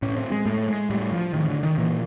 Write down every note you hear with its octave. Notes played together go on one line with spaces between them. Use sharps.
A2 C#4
C4
G#3
A2 A3
G#3
A2 G3
F3
A2 D#3
D3
D#3
A#2 E3